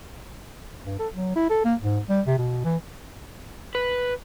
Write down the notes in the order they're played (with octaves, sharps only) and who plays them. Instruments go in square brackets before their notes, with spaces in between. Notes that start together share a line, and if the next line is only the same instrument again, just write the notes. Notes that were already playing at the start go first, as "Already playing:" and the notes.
[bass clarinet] G2
A4
F#3
E4
A4
A#3
G#2
G3
C3
B2
E3
[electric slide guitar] B4